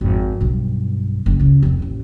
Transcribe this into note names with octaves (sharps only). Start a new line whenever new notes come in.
G#1 F2
B1 G2
F#1 D2
C#2 C#3
F1 E3
A1 D#2